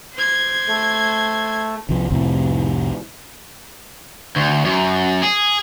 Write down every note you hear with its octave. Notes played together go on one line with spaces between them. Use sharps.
C5 G#6
A3
C2 F3
C2 F2 A2 C3
D2
F#2
G#4